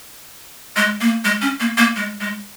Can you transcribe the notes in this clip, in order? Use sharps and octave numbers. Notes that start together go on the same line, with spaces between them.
G#3
A#3
G#3
C#4
A#3
A#3
G#3
G#3